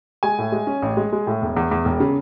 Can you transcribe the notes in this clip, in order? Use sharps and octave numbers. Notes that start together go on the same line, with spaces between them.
G#3 G#5
A2
G#3
C#4
A1
G#3
G#3
A2
E1
E2
E2
E1
C#3